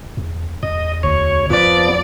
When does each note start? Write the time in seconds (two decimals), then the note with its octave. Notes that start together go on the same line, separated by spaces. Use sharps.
0.17 E2
0.63 E2 D#5
1.03 D2 C#5
1.50 F2 F3 B3 D5